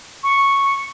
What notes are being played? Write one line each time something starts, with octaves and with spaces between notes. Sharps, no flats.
C#6